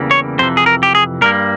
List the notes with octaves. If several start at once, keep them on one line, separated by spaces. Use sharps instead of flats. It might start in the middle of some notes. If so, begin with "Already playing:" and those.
Already playing: E2 C#3 E3 G3 A#3
C#5
F2 C3 E3 C5
G#4
A#4
G4
G#4
G2 G3 A#3 A#4